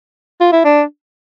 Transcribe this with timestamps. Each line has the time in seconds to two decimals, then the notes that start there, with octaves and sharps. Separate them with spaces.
0.41 F4
0.52 E4
0.65 D4